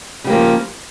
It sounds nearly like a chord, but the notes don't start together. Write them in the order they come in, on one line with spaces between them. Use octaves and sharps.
C#3 G3 A#3 F3